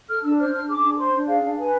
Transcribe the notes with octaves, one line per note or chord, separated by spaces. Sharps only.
A4 F6
D4 E6
C5 F6
D4 F6
G#4 D6
D4
C5 C6
D4
G#4 F5
D4
B4 G#5